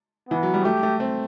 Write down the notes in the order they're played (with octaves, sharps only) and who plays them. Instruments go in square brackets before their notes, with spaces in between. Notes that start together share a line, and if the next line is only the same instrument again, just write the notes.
[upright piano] E3 [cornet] B3
[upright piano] F#3
G3
[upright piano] A3 [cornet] G4
[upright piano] A3
C4